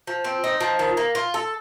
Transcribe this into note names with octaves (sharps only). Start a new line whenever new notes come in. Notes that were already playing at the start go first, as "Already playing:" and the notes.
F3
C4
D#4
F3
D#3
A#3
F4
A4